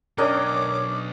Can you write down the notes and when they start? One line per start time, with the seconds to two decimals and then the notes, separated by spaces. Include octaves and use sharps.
0.18 B1 C#4 D4 A#4 C#5 D#5 G5 D6